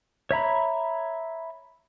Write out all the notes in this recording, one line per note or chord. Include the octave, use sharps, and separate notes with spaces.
C#5 E5 A#5 B5